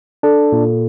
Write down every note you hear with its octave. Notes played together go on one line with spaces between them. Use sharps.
D4 A4
A#2